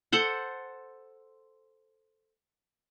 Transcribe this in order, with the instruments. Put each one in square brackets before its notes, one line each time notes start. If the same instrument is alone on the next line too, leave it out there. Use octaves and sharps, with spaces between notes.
[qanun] A4 C5 F#5